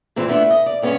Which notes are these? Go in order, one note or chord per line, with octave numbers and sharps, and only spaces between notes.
A#2 E3 C4
A3 B3 D4 E4
D#5
D5
G2 B3 C#4 C#5